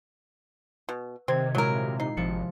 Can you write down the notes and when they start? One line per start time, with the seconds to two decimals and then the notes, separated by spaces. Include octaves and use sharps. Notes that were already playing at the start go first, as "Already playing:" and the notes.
0.89 B2
1.28 C3 D#3 C4 G#6
1.55 A#2 F#3 G#3 E4 A#4
2.00 D#4 C7
2.17 G#1 C3 F3 C#7